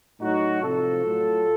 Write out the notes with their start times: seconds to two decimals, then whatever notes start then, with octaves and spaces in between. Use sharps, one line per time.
0.20 A2 F#3 D#4 F#4
0.62 C3 F3 F4 A4
1.05 A2 F#3